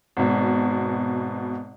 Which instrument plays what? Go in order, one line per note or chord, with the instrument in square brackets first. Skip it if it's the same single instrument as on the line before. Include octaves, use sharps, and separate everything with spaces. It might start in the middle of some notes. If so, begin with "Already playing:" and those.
[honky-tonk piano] G#1 B2